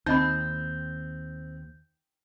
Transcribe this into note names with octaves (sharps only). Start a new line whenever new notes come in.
D#2 C4 D#4 D#5 B5 G6